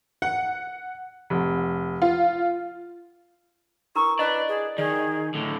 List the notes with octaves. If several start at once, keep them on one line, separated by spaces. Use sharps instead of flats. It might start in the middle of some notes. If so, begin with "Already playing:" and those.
F#5
F1
F4
E4 A#4 B4 C#6
B4 D5 D#5 A5
G#4
D#3 G#4
A2 D3